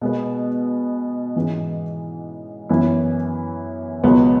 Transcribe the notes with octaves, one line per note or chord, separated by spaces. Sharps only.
B2 G#3 B3
G#2 E3 G#3 C#4
F#2 E3 B3 E4
C#2 B2 F#3 B3